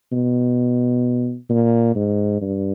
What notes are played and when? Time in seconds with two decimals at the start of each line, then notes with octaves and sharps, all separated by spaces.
0.12 B2
1.49 A#2
1.95 G#2
2.41 G2